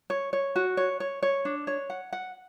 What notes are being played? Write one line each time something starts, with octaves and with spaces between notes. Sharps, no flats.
C#5
C#5
F#4
C#5
C#5
C#5
D4
C#5
F#5
F#5